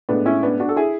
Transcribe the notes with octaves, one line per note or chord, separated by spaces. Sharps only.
A2 G#3 B3 D4
C#4 E4
B3 D4
D4 F#4
A4
E4 G#4